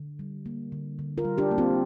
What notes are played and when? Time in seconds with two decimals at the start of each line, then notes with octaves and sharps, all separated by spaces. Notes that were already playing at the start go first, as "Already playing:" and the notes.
Already playing: D3
0.19 G3
0.46 A#3
0.72 D3
0.99 D3
1.18 F4 A#4
1.25 G3
1.38 D4 G4
1.51 A#3
1.58 C4 F4